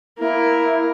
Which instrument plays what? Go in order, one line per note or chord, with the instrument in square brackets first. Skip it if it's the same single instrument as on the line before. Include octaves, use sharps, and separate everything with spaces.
[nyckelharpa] A#3 A#4 [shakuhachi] E4